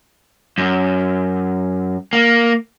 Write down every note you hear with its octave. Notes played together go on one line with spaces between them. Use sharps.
F#2
A#3